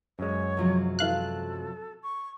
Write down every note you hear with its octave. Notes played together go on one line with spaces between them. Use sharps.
F#2 G#3 C#5
C3 F3 F#3
E3 A4 F5 F#6
C#6